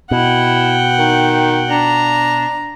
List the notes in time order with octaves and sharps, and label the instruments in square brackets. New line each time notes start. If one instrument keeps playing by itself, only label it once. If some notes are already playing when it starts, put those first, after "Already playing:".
[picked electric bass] B2 [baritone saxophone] E4 [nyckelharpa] F#5 G5
[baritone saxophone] D#3
[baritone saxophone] D4 [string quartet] A#5